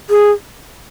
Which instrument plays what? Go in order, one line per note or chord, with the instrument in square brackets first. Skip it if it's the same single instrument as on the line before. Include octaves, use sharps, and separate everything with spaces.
[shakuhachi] G#4